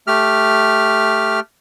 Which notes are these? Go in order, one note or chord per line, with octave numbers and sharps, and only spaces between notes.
A3 G4 F6